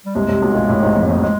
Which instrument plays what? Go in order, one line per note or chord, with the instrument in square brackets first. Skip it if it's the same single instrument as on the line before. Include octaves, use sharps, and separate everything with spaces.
[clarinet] G3
[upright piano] C2 C3 [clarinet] G#3
[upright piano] C2 C3
B1 B2
A#1 A#2
A1 A2
G#1 G#2
F2
F2
[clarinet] G#3